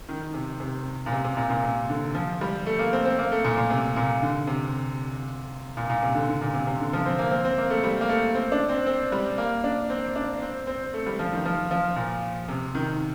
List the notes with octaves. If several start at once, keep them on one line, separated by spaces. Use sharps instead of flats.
D#3
C3
C3
A#2
C3
C3
A#2
A#2
C3
D3
F3
G3
A3
A#3
C4
C4
A#3
A3
A#2
A#2
C3
A#2
D3
C3
A#2
A#2
C3
D3
D3
A#2
C3
C3
D3
F3
C4
A#3
C4
C4
A#3
A3
G3
A#3
A3
C4
D4
C4
C4
G3
A#3
D4
C4
D4
C4
C4
A3
G3
F3
D#3
F3
F3
A#2
C3
D#3